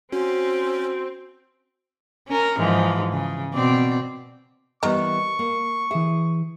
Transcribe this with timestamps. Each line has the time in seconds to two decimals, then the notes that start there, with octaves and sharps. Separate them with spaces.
0.12 C4 C#4 F#4
2.28 C#4 A#4
2.58 G#2 E3 F3
3.12 C#3
3.54 B2 C4 D5
4.83 D#3 E3 G3 B3 A#5 C#6
5.39 A#3
5.91 E3 G#4 E5